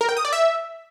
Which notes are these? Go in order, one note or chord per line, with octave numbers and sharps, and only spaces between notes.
A#4
G5
D#6
D5
E5